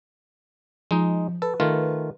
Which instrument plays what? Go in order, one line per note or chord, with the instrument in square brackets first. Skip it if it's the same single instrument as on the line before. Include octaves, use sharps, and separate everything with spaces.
[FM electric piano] F3 [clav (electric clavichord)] G#3 D#4
[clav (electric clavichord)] A4 [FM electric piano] B4
[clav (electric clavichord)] D#3 A3 F4